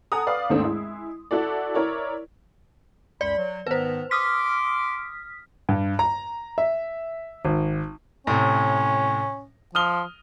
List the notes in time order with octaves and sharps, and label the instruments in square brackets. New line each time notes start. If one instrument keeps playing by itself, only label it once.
[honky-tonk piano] A4 F#5 G#5 A#5 D#6
B4 D5 F5
D#2 G#2 D#3 A3 C4 D4
G#3 E4
E4 F#4 A4 D5
E4 A#4 C#5 D5
[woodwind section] C#2 F#2 B5 [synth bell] D5
[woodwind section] F#3
[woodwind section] G#2 D#3 B3 [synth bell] B4 C5
[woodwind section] C6 D6 [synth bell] D#6 F6 B6
[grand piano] G2
A#5
E5
G#1
[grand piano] A2 C3 [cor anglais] C#4
[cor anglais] F3 [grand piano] D#6 F6 G7